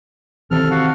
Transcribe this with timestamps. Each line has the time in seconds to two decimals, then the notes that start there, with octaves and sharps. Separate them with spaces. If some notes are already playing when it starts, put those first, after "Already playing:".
0.51 C3 D#3 E3 A4 F6
0.71 F#4 F5 F#5